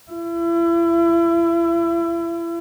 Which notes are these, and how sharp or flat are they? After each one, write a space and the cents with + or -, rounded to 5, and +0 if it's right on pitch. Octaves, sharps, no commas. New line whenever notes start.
E4 +35